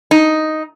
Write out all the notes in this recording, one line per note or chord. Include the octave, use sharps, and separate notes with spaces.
D#4